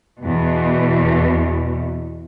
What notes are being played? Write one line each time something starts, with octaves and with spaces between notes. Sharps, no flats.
E2 B2